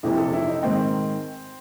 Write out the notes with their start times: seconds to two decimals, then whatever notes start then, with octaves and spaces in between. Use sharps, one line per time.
0.03 F2 C3 E3 E4
0.18 A4
0.33 E4
0.48 D#4
0.63 G#2 D#3 C4